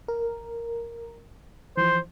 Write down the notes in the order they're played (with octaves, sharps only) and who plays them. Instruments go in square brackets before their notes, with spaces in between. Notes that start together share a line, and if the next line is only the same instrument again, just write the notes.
[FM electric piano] A#4
[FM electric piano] E3 F3 [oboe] C5